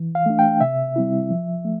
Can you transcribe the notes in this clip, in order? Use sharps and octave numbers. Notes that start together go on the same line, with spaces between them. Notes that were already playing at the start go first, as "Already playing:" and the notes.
Already playing: E3
F5
A3 D4
G5
C3 E5
G3 C4 E4
F3
A3